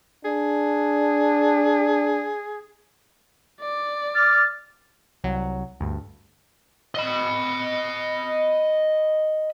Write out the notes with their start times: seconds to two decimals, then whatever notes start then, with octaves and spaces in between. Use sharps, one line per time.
0.25 D4 G#4
3.61 D5
4.15 D6 F6 A6
5.24 C2 F#3
5.80 D2 G2
6.95 D#5 B5